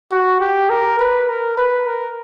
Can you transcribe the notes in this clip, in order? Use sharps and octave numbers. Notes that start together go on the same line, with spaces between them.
F#4
G4
A#4
B4
A#4
B4
A#4